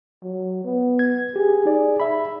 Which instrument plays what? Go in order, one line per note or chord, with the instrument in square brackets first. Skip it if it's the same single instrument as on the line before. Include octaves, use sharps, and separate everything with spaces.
[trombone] F#3
B3
[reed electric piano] G#6
[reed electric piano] G4 [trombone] G#4
[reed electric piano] D#4 D5
E5 B5